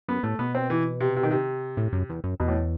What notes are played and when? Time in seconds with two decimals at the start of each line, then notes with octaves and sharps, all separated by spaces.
0.08 F#2 B3
0.23 A2 A3
0.39 B2 B3
0.55 C4
0.70 E3
1.00 C3
1.16 C3
1.23 D#3
1.31 C3
1.77 A2
1.93 F#2
2.09 E2
2.24 F#2
2.40 E2 B2
2.48 A2